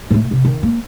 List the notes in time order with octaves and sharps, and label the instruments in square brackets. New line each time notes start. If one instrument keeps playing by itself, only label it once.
[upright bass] A2 A3
C3
D#3
A#3